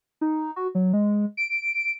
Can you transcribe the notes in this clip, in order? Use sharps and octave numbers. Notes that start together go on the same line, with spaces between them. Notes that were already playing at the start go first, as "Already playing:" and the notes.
D#4
F#4
F#3
G#3
D7